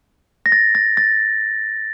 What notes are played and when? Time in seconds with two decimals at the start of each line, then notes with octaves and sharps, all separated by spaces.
0.46 A#6
0.52 A6
0.75 A6
0.97 A6